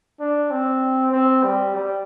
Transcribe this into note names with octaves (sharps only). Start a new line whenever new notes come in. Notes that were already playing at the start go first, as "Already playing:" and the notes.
D4
C4
C4
G3
G3